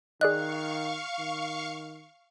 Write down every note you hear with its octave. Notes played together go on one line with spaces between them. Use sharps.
D#3 G#4 D5 D#5 F5 C#6 F#6
D#3